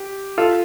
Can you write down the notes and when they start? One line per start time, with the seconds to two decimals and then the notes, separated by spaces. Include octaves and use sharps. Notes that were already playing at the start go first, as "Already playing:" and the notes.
Already playing: G4
0.38 F4 A4